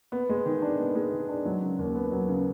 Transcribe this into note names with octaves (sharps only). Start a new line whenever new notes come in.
B3
G#3
D#3
D4
B3
G#3
D#3
D4
F#3
C#3
D#2
B3
F#3
C#3